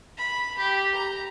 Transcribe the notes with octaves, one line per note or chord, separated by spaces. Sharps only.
B5
G4
A#5